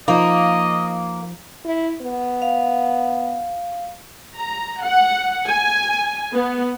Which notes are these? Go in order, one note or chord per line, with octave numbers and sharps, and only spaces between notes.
F3 A#3 D#4 D#5
E4
B3
F5
A#5
F#5
G#5
B3